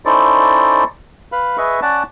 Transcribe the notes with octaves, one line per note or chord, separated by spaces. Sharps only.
C#4 D#4 E4 A4 C5 D5
B4 F5 B5
G#4 B4 D#5 E5 C#6
C#4 D5 F#5 A5